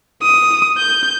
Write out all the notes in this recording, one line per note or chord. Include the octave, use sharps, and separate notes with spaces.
D#6
G6